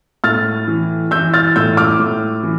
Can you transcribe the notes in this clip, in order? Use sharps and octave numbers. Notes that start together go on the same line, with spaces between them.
A2 F6 A6
E3
E3 E6 G6
F6 A6
A2 E6 G6
D6 F6
A2
E3